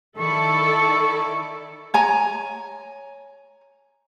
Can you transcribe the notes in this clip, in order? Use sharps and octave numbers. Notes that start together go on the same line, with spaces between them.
D#3 E4 A4 D5 C#6
C#5 G#5 A#5